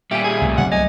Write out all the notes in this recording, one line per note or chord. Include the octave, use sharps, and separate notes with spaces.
A#2 G3 G4 E5 G#5
G#4
C2 A3
C2 F#3 A3 F#5
D#5 G#5